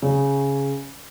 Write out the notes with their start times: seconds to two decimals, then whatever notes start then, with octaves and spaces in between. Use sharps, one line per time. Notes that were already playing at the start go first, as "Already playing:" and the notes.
0.02 C#3